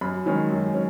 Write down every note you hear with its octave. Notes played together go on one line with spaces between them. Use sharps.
F#2 B5
D#3 G#3 C#4
F#2
C#4